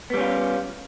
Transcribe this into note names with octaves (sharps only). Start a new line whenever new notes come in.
G3 B3 C#4 F4